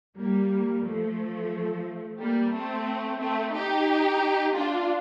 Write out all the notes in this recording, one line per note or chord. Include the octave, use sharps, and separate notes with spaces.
G3 A#3
F3 A3
G3 A#3
A3 C4
A3 C4
D#4 G4
D4 F4